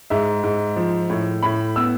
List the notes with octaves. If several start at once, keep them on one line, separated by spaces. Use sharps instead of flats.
G#2 E5
G#2
F3
A2
A2 B5
B3 E6